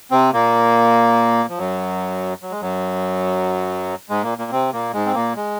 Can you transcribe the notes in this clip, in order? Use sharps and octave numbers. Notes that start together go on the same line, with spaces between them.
C3 C4
A#2 A#3
F3
F#2 F#3
F#3
G#3
F#2 F#3
G#2 G#3
A#2 A#3
A#2 A#3
C3 C4
A#2 A#3
G#2 G#3
C4
A#2 A#3
G#3